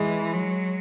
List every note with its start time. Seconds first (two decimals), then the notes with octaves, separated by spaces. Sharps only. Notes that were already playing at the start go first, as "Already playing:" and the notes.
Already playing: E3 G#3
0.33 F#3